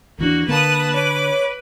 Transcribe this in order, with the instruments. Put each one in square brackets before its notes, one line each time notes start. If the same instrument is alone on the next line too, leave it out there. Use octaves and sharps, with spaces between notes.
[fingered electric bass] D#2 E3 D4 [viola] A#3 F#4
[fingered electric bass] D3 [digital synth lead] A#3 [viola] B4 [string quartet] A5 D#6
[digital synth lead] C#5 [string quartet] D6